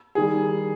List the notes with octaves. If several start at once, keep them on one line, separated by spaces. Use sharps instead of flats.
D#3 G3 G#4